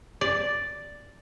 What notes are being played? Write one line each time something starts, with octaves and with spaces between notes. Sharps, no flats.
D5